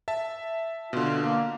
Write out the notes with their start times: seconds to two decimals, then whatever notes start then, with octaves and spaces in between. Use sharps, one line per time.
0.08 E5 A5
0.93 B2 D3 F4
1.21 A#3